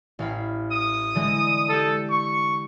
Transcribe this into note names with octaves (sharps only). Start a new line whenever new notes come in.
A1 F5 B5
D#6
D3 E3 G#3
G4 A4 E6
C#6